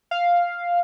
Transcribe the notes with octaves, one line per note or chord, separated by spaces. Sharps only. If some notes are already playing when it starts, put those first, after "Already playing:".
F5